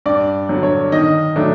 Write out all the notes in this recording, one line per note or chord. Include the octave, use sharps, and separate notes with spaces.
G2 D5
D3 F#3
C#5
D#3 D#5
F#3 A3 D4